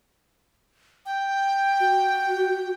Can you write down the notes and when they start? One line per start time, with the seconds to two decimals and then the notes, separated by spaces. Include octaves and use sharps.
1.06 G5
1.80 F#4